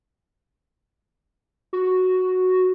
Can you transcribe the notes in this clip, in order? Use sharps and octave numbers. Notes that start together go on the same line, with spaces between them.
F#4